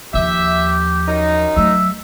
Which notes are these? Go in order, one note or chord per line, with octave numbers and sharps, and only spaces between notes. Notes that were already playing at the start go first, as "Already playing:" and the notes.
D#2 F3 G4 E5
F#2 D#3 D#4
F#3 A3 E5